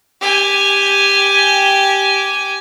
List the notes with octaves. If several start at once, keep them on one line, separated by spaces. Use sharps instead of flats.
G4 G#5